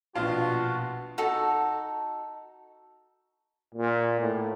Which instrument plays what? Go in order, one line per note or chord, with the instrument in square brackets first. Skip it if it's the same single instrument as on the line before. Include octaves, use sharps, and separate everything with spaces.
[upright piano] A#1 B2 [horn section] F4 [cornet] F#4 [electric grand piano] F5 A5
[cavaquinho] D#4 F#4 A4
[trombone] A#2
A2